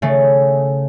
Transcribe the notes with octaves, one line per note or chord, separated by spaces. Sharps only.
C#3 A3